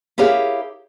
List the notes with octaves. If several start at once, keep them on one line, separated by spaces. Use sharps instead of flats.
E4 G4 G#4 A#4 C#5 F5